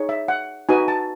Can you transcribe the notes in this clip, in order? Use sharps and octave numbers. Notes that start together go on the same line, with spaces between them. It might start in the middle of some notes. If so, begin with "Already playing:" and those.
Already playing: D#4 G#4 C#5
E5
F#5
D#4 F#4 B4 G#5
A5